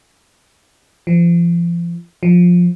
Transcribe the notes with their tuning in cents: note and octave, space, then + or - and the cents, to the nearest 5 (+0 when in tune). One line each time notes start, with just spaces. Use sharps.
F3 -35
F3 +15